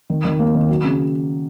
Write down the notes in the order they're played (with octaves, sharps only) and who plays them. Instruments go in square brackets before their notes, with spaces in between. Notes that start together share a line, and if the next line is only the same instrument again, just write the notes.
[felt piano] D#3
D#3
A#3
D#3
F#3
C#3